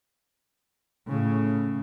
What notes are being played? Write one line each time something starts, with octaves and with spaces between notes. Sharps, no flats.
A2 C#3